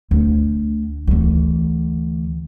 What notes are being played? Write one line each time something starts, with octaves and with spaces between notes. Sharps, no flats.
D2
D2 E3